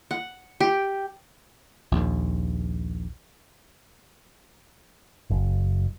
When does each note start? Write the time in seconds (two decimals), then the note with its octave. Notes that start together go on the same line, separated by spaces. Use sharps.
0.11 F#5
0.60 G4
1.92 A#1 D#2
5.30 F#1